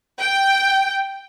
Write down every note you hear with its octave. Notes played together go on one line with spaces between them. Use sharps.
G5